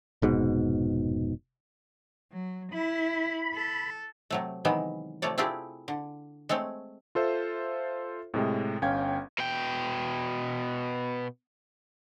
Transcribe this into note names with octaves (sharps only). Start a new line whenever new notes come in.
F1 G#2 B2
F#3
E4 B5
A4
C3 F#3 A3
C3 D#3 E3 F#3 G#3 B3
C3 F3 A3 C#5 D5
A3 C4 E4 F4 G4 G#4
D3
G#3 A3 C4 C#5
F4 A4 C5 E5
A2 C3 G#3
G1 C#4 F5 G5 G#6
B2 G5